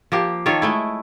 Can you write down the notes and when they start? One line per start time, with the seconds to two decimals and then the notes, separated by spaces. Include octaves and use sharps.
0.12 F3 A#3 G4
0.46 D#3 F4 A4 C#5
0.62 G#3 A3 E4